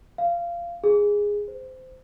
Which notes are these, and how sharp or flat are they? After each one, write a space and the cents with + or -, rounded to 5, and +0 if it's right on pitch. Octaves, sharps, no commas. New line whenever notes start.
F5 -20
G#4 -10
C5 -20